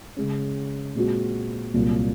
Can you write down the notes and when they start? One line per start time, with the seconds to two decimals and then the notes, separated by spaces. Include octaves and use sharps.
0.16 C#3 G#3 C#4
0.95 A#2 G#3 C4 F#4
1.74 C2 A#2 F#3 A#3